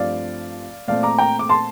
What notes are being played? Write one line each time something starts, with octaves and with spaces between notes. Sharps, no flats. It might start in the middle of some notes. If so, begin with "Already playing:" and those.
Already playing: G2 F3 A3 C4 D5 F5
A#2 A3 C4 D5 F5
A#5 D6
G5 A#5
D6
A5 C6